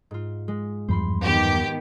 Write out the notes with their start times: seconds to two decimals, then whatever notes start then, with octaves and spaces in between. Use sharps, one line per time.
0.11 G#2 F4
0.48 G#3
0.88 E2 G2 F3 C5 B5 C6
1.24 D#3 B3 G4